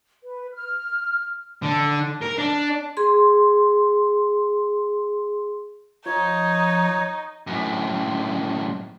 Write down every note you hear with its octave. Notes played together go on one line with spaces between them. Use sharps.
B4
F6
D3
A#4
D4
G#4 C6
F3 D#4 C#5
F#2 A2